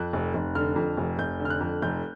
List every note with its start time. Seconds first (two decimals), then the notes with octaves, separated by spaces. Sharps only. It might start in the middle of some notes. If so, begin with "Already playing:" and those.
Already playing: F2 F#6
0.13 F1
0.34 F1
0.55 D3 F6
0.76 F2
0.97 F1
1.18 F1 G6
1.40 D3
1.45 F6
1.50 F#6
1.61 F2
1.82 F1 G6